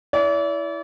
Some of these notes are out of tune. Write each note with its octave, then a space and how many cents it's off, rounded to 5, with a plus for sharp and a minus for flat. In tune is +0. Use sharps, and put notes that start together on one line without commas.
E4 +0 D5 -40